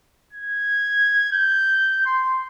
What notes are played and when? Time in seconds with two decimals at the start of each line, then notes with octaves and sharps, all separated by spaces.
0.33 G#6
1.33 G6
2.06 C6